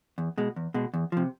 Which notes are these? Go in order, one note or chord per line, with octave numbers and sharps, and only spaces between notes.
E2
B2 G#3
E2
B2 G#3
E2
C3 F3